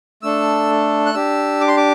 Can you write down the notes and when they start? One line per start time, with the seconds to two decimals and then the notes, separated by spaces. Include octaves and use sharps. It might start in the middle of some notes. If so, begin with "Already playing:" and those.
0.23 A3 D4 A4 E6
1.06 F#6
1.14 D4 G4 E6
1.61 D6
1.68 C6
1.77 D6